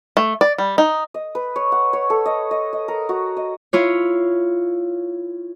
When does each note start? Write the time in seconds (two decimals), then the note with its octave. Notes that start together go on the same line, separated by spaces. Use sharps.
0.17 A3
0.41 D5
0.58 G3
0.78 D#4
1.14 D#5
1.35 B4
1.56 C#5
1.72 F#5
1.93 C#5
2.10 A4
2.26 D#5
2.51 D#5
2.73 D#5
2.88 A#4
3.09 F#4
3.37 D#5
3.73 E4 F4 C#5